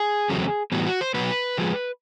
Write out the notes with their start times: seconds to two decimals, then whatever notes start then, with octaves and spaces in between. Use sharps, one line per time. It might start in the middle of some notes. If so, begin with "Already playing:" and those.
Already playing: G#4
0.29 E2 C#3 F#3 A3 C4
0.72 A2 E3 G3 B3 F#4
0.86 F#4
1.01 C5
1.14 B2 F#3 B3 B4
1.57 D3 F3 G#3